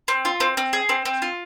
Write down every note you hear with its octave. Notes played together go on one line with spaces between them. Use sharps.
C4
F4
C4
C4
G#4
C4
C4
F4